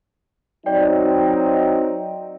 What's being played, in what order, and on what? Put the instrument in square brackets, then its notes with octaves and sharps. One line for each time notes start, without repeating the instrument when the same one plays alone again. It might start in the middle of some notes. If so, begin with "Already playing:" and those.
[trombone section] F#3 C4 D#4 [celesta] D5 G5